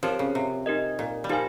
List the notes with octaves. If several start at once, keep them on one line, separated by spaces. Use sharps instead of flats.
F3 C4 G4 A#4 C#5
C#3
C3
D#4 G4 A#4 D#5
A#2
G3
F3 D#4 G4 A#4 F5 G#5